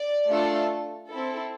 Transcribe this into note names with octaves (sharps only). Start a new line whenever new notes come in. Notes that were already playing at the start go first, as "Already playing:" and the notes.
Already playing: D5
A3 D4 F4 A4
C4 E4 A4